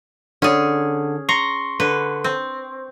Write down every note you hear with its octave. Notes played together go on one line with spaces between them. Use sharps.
D3 C#4 G#4
A#5 C6 C#6
D3 B4
C4